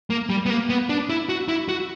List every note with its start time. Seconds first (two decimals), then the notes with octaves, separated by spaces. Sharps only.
0.10 A#3
0.30 G3
0.46 B3
0.50 A#3
0.70 B3
0.90 D4
1.10 E4
1.29 F#4
1.48 E4
1.69 F#4